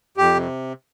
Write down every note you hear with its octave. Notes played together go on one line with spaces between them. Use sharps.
F2 G4
C3